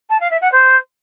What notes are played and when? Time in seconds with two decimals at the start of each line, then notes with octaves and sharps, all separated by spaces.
0.10 A5
0.20 F5
0.31 E5
0.41 F#5
0.52 C5